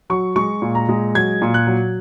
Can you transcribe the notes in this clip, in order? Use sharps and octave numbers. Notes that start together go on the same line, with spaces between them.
F#3 C#6
G#3 C#6
A#2
A#5
G#3
F#3 G#6
A#2
F#6
F#3